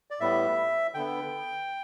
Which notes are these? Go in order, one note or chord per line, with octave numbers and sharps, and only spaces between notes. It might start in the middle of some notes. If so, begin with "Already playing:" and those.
D5
A2 G3 B3 E5
D3 B3 G5